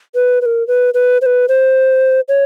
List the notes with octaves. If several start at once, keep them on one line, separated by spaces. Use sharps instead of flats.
B4
B4
A#4
B4
B4
C5
B4
C5
C#5